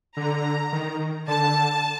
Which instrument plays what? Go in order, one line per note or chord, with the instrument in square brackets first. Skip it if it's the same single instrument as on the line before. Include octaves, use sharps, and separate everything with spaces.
[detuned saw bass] D3 [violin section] A#5
[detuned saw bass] D#3
[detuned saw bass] D3 [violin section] A5